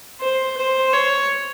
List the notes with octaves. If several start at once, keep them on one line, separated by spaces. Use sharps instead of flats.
C5
C5
C#5